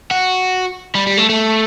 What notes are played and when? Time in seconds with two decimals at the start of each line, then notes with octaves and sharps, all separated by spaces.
0.11 F#4
0.95 G3
1.07 G3
1.17 A3
1.29 A3